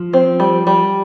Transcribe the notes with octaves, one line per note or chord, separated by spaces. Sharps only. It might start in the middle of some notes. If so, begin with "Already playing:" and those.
Already playing: F3
C4
G3
G3